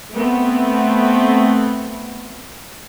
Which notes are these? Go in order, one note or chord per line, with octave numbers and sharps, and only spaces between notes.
A3 B3 C4